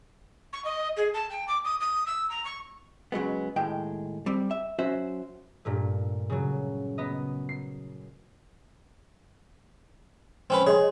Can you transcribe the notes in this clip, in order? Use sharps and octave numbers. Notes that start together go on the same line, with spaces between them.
C#6
D#5
G#4
A5
G5
D6
D#6
D#6
E6
A#5
C#6
C#3 F#3 G#3 B3
D#2 A2 G#3 G5
G3 C4
E5
F#3 C#4 F#4 C5 E5
G2 A#2 A3
C#3 F#3
B3 D#5
C7
C4 C#4 B4
G#4 C#5 D#5 C6